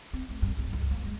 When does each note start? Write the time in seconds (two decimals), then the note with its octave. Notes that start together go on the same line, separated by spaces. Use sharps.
0.13 C4
0.30 A3
0.42 G2
0.58 G2
0.73 C#2
0.91 A#3
1.06 G#3